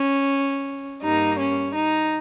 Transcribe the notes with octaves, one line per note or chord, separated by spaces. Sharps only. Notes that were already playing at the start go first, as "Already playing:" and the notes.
Already playing: C#4
G2 G3 A#3 D#4
C#4
D#4